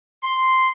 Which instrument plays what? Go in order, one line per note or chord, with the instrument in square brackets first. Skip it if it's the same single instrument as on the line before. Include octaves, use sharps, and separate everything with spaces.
[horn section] C6